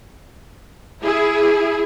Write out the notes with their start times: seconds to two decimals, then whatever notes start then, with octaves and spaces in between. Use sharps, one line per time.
1.01 E4 G#4